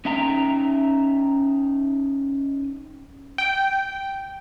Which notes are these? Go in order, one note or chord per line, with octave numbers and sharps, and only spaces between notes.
C#4 D#4 E5 G5 A#5
G5